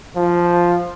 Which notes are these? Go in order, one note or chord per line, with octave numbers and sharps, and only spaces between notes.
F3